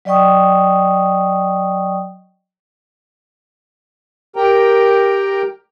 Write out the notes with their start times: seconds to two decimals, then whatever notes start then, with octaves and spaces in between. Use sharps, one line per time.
0.05 F#3 D5 D#5 G5 C#6 D#6
4.36 G4 A#4 G5 A#5